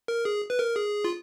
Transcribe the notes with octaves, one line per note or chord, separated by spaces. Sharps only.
A#4
G#4
B4
A#4
G#4
F4